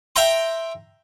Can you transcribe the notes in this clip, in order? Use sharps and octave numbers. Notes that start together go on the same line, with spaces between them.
E5 G5 A#5 C6